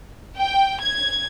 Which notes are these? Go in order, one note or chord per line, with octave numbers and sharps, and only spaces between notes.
G5
G#6